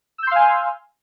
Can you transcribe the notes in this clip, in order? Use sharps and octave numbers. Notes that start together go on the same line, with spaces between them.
F5 G#5 C6 E6 G6